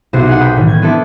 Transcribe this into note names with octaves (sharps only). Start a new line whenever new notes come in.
B1 C3 F#4 C5 A#5
D#4 G#4 F#5
G5 B5 D#6
A2 D#3 E3
G#6
B3 C4 D4 E4 A4